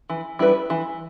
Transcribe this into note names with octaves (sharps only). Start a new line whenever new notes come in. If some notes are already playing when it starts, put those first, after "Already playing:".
E3
G3 E4 B4
E3